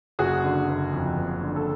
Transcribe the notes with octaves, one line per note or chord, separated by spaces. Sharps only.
F#1 F#4 G#4
D3
F#1
F2
F#1
D3
A4